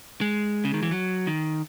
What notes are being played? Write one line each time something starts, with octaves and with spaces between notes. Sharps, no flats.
G#3
C#3
D#3
E3
F#3
D#3